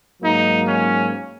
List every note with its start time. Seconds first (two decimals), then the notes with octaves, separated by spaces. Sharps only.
0.21 G#2 F#3 A#3 D#4
0.66 C#4